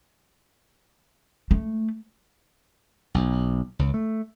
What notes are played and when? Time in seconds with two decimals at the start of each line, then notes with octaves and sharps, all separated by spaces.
1.51 A3
3.14 B1
3.79 C#2
3.94 A3